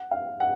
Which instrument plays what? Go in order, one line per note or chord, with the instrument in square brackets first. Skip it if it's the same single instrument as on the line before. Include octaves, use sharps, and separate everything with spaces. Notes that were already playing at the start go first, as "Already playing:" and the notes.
Already playing: [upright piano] F#5
F5
F#5